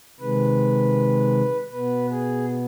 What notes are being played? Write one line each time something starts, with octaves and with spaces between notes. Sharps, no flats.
C3 D#3 G#3 B4
B2 B3 B4
G#4